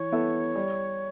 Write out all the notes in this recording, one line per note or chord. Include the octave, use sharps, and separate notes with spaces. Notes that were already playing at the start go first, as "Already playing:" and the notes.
Already playing: E3 C#5
B3 E4 A4
G3